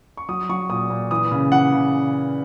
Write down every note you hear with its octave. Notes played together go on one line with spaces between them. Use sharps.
C#6
F#3 D#6
F#3 C#6
A#2 D#6
A#2
E3 D#6
C#3
E3 F#5
C#3